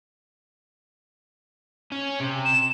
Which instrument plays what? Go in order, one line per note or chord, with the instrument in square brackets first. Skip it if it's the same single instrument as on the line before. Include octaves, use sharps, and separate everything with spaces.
[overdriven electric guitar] C#4
C3
[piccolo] E7